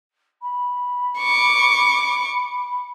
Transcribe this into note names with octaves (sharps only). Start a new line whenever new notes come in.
B5
C#6 D6